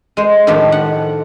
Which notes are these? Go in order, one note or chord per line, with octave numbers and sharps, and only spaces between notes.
G#3 C5
A2 D#3 F3 A3 D4 G4
F#5